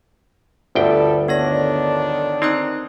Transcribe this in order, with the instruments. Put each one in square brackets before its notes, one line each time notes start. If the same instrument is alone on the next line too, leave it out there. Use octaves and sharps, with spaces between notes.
[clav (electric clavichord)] G1 D2 G5 [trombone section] B2 G3 A4
[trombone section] D3 D#3 D4 [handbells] B3 C#5 A#6
[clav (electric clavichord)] C4 [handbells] D#4 D#6 F#6